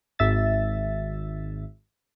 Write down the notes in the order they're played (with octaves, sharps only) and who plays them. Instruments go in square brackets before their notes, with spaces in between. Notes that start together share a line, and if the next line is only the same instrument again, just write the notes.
[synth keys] G#1 E5 A6